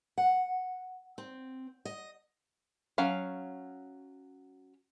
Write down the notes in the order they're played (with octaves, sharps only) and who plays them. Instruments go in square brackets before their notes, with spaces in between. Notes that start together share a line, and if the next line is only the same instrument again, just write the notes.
[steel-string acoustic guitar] F#5
C4
D#5
[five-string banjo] F#3 C#4 F5